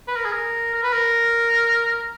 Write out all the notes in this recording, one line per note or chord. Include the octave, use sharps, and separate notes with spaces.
B4
A#4
G#4
A#4
A#4
B4
A#4